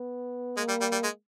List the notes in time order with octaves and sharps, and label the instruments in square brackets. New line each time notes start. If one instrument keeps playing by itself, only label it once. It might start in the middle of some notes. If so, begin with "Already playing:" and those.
Already playing: [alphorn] B3
[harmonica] G#3 [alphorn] A#3
[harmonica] G3
G3
G3
G#3